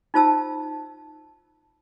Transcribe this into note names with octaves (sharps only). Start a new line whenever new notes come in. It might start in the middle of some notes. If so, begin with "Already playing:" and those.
D#4 F4 C5 A5 E6